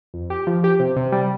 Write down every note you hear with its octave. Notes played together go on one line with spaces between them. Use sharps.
F2
G4
F3
G4
C3
C3
G3